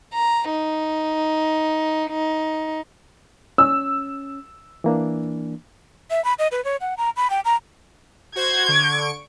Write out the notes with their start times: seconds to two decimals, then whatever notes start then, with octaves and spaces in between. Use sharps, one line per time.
0.14 A#5
0.50 D#4
2.10 D#4
3.58 C#4 E6
4.84 E3 A#3 D4
6.11 E5
6.24 B5
6.39 D#5
6.52 B4
6.65 C#5
6.81 F#5
6.98 A#5
7.16 B5
7.30 G5
7.45 A#5
8.36 F#4 C5 G#6 C7
8.68 D3 C#6 D7